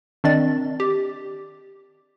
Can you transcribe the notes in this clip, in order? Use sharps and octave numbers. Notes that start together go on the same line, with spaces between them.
D#3 C4 D4 D5 D#5 A6
G4